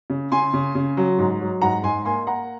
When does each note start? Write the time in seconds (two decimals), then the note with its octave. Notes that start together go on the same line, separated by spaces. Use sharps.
0.10 C#3
0.32 C#3 G#5 C6
0.54 C#3
0.75 C#3
0.97 F#3
1.18 G#2
1.41 F#3
1.62 G#2 F#5 A#5
1.83 G#2 G#5 C6
2.05 A#3 G#5 C6
2.27 A#3 F#5 A#5